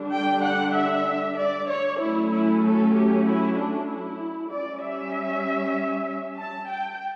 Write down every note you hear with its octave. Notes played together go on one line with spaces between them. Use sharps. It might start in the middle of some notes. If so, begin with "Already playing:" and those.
Already playing: D3 G3 D4
G5
F#5
E5
D5
C#5
F#3 A3 C#4 E4
E4
A4
G4
E4
D4
E4
G3 C#4 D5
E5
A5
G5